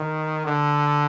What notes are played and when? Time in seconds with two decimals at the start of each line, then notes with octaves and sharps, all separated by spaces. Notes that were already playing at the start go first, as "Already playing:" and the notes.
Already playing: D#3
0.46 D3